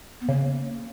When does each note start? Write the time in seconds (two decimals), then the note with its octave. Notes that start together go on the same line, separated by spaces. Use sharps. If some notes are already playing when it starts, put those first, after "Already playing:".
0.21 B3
0.28 C#3 A#3